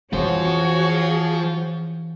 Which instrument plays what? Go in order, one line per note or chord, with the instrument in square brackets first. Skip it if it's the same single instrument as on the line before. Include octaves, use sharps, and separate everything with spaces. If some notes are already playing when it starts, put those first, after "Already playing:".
[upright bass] F2 E3 [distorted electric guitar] F4 C5 [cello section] F#4 C#5 [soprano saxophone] G#4